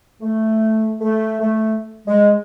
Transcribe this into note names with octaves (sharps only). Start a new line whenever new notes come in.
A3
A3
A3
G#3